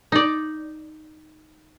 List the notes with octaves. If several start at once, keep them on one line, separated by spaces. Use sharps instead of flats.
D#4 D5